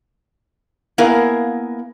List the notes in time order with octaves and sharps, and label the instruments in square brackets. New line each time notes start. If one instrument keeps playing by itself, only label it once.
[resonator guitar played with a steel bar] A#3 B3 E4 G#4 A#4 F5